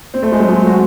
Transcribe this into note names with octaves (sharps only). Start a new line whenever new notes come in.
C4
A3
G#3
F#3
G#3
F#4